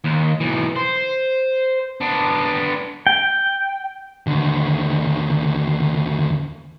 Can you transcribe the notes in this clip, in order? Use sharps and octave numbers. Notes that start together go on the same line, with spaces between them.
D#2
B1 E3
C5
B3 D4
G5
D#2 D3